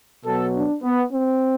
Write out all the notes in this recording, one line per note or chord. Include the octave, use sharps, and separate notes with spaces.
B2 F#3 B3 A4
D4
B3
C4